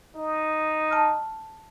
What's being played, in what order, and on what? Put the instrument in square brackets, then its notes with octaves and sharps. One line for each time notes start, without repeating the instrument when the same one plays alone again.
[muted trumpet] D#4
[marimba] A5 E6 F6